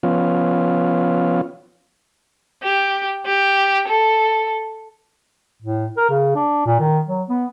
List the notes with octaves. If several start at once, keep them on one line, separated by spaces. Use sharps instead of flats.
F3 B3 C#4 F4
G4
G4
A4
A2
A#4
C#3
D4
A#2
D#3
F#3
B3